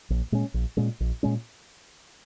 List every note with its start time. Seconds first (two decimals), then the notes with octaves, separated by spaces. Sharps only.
0.10 A#1
0.32 A#2 G#3 C#4
0.54 A#1
0.77 A#2 G#3 C#4
1.00 A#1
1.23 A#2 G#3 C#4